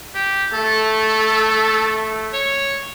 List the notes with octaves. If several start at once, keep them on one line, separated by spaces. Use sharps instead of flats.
G4
A3 A4
C#5